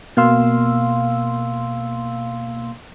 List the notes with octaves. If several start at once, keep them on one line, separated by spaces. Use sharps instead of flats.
B2 A#3 F5 C6 E6